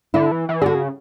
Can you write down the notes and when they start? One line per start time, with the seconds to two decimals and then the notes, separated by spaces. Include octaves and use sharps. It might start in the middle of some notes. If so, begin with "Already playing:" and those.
0.14 D3 E4
0.32 E3
0.49 E3
0.61 D3 G#4
0.66 F#4
0.75 C#3